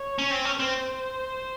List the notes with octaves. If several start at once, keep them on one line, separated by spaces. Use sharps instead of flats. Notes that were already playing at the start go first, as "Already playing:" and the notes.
Already playing: C#5
C#4
C4
C#4
C4 C5